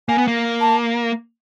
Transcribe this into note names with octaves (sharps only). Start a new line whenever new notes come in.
A#3 G#5
B3
A#3
A5